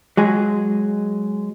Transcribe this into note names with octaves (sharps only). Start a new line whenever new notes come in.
F#3 G#3 G#4